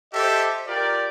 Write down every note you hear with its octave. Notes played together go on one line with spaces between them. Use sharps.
G4 A4 C5 D#5 E5
F4 G4 A#4 D5